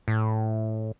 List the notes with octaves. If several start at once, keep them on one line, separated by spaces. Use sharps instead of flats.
A2